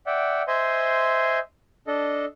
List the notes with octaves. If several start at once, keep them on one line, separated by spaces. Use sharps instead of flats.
D5 E5 F#5 G5
C5 D#5 E5 G#5 C6 G6
D4 A4 D#5